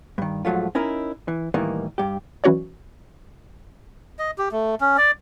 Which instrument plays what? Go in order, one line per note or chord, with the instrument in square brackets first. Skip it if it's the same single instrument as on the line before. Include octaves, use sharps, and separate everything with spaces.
[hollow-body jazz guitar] G2 D#3
G#2 F3 F#3 A3 F4
C#4 D#4 E4 A#4
E3
A2 D#3 E3 G3 A#3 D#4
G2 G4
[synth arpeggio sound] E3 F#3 C#4 F#4 C#5 D5
[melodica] D#5
G4
A3
C#4
D5